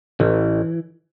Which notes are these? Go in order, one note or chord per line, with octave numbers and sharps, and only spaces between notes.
A1 E3